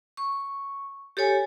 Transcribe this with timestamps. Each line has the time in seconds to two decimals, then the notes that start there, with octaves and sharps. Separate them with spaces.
0.17 C#6
1.17 G4 A4 C#5 G#5